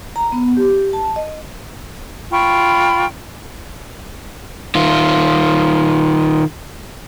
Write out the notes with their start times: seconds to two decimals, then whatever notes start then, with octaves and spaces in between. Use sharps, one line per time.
0.16 A#5
0.32 B3
0.57 G4
0.93 A5
1.16 D#5
2.31 F4 G5 B5 C#6
4.75 D#3 F4